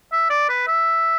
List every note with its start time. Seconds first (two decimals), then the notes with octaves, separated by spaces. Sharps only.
0.12 E5
0.30 D5
0.49 B4
0.68 E5